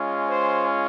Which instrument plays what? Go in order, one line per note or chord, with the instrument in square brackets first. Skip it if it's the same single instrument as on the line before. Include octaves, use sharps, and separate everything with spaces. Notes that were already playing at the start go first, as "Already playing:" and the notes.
Already playing: [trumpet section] G#3 C#4 F4
C5